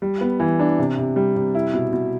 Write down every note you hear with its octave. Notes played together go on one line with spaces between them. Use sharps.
G3
B3
E3
D4
C3
C3
G3
C3
E4
B2
B2